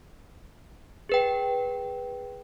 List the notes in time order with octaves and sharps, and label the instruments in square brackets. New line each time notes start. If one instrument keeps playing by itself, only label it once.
[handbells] G#4 B4 G5